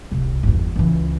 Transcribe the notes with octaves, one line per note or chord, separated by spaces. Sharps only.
D#1 C2
G1 E2
C#2 E3